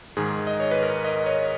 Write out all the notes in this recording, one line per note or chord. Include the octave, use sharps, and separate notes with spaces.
G#2 D#3 G#4
D#5
C#5
B4
A#4
D#5
C#5